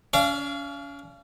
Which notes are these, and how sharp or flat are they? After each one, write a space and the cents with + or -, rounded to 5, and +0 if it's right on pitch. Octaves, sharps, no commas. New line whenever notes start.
C#4 +35 D5 +0 F5 -30